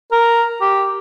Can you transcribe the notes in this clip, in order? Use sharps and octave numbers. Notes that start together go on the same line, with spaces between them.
A#4
G4